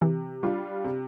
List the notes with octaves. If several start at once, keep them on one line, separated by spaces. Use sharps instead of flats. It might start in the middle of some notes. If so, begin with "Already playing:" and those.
C3 E3
G3 D4 F4
C3